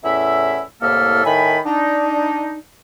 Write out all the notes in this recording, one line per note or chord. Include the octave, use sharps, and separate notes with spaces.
E2 A2 C#4 E4 E5
C2 A2 A#3 A4 E5 F6
A2 D#3 G#5 B5
D4 D#4